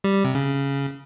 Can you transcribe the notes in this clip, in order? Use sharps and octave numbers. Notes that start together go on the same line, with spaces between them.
G3
G3
C3
C#3